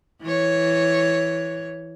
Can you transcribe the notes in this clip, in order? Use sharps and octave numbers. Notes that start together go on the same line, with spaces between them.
E3 C#5